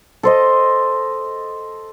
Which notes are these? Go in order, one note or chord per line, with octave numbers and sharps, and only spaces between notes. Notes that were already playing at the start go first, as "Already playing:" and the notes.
A4 C5 D#5